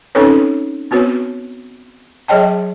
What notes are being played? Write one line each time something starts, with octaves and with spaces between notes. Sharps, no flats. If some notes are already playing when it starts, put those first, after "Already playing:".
C4 C#4 D#4 A4 B4 C#5
B3 C4 F#4 B4 C#5
F#3 G#4 C#5 D#5 G5 A5